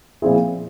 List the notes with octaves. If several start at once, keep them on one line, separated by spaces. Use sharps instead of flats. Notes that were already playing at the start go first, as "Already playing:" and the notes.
A#2 F3 C4 E4 G#4